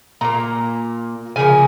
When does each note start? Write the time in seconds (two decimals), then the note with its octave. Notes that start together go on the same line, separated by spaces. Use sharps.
0.21 A#2 A#3 A#5
1.36 C#3 F3 A#3 G#5